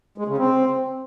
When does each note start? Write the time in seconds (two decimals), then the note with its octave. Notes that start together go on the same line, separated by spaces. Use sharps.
0.18 G#3
0.28 C#3
0.38 C4